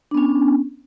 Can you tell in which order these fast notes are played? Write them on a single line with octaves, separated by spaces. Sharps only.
D4 B3 C#4